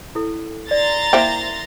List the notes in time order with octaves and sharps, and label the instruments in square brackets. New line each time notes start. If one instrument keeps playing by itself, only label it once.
[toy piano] E4 A4
[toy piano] D5 [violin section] A#5 C6 A6
[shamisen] A#3 E4 G5 [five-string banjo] C5 E5